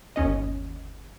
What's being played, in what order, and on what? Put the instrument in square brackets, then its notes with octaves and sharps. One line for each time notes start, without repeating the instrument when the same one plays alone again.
[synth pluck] G1 D#2 C#4 D#5